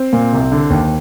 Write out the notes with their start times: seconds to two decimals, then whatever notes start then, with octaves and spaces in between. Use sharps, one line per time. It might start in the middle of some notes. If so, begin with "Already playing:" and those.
Already playing: C4
0.13 A#2
0.33 C2
0.52 D3
0.70 D#2